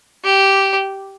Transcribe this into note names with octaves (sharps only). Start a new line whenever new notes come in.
G4